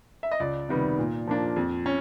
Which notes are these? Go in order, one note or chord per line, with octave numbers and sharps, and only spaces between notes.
E5
D#5
C#2 D5
C3 D#3 G3 B3
A#2
F3 A#3 D4
F2
C#4